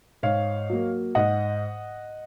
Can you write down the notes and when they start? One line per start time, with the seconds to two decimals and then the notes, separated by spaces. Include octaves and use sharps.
0.23 G#2 C#5 F5
0.70 F#3 A#3
1.15 G#2 D#5 F#5